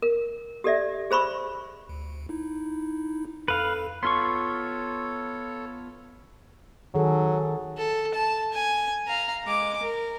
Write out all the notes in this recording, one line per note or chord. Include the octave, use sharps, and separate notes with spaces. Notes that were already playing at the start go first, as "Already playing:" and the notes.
A#4
G4 A4 D5 E5
G#4 C5 B5 C#6 E6
D2
D#4 E4
F2 A4 B4 F5
B3 F4 A4 C#5 C6 C#6
D#3 F#3 G#4 A4
A4
A5
G#5
F5 A#5
G#3 D6
A#4